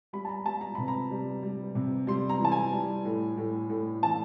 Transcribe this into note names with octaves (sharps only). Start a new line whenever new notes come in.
G3 B5
A5
A#5
G3 A5
A#5
C3 B5
A#5
G3
G3
C3
G3 C6
A#5
E3 A5
G#5
G3
A2
A2
A2
E3 A5